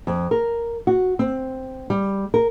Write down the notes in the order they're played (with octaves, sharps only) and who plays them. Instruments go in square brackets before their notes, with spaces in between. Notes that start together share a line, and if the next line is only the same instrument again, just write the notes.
[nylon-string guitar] F2
A#4
F#4
C4
G3
A#4